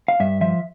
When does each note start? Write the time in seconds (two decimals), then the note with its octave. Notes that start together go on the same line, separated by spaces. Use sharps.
0.08 F5
0.20 G2 E5
0.41 F3 E5